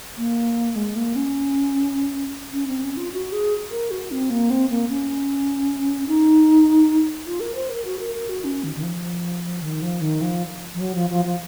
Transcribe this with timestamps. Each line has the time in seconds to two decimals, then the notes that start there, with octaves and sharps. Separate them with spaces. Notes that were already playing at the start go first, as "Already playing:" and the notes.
0.17 A#3
0.76 G#3
0.96 A#3
1.15 C#4
2.52 C#4
2.67 C4
2.82 C#4
2.97 F4
3.13 F#4
3.32 G#4
3.71 A#4
3.91 F#4
4.11 C4
4.30 A#3
4.50 C4
4.69 A#3
4.89 C#4
6.07 D#4
7.26 F4
7.40 A#4
7.55 C5
7.70 A#4
7.85 F#4
7.99 A#4
8.14 A#4
8.29 F#4
8.44 C#4
8.64 D#3
8.75 D#3
8.83 F3
9.62 D#3
9.82 F3
10.01 D#3
10.21 F3
10.74 F3
10.80 F#3
10.95 F3
11.10 F3
11.25 F3